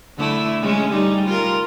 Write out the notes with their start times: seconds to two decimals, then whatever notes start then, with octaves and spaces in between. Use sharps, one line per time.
0.17 D3 A3 E4
0.61 G#3 C#4
0.90 G3 D#4
1.26 F4 A#4